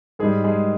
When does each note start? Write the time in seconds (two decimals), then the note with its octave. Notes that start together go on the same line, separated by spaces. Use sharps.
0.19 G#2 G3 G#3 G#4
0.44 G#3 G#4